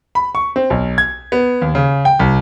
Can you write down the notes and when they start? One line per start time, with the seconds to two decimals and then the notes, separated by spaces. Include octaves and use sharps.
0.15 B5
0.35 C#6
0.56 C4
0.70 B1
0.98 G#6
1.32 B3
1.61 D#2
1.75 C#3
2.05 G5
2.19 C2